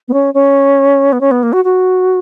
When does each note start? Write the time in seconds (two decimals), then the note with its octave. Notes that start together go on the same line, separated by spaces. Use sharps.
0.08 B3
0.13 C#4
0.34 C#4
1.12 B3
1.21 C#4
1.31 B3
1.43 A#3
1.53 F#4
1.64 F#4